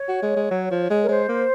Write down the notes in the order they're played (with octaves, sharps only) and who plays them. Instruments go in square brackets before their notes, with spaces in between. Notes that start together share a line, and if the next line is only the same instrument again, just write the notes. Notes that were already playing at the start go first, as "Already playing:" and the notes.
Already playing: [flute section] C#5
[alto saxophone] F#4
G#3
G#3
F#3
F3
G#3
[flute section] A#4
[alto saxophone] G#3 [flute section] C5
[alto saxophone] A#3